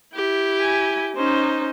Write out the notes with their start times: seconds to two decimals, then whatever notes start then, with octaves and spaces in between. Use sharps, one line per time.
0.14 E4 G4
0.60 G#5
1.16 C#4 D#4 C5